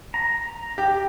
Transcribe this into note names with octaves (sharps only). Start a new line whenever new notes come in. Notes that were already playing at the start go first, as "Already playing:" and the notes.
A#5
G4